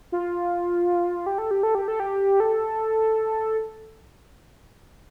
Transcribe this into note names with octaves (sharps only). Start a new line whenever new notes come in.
F4
G4
A4
G4
A4
G4
A4
G4
A4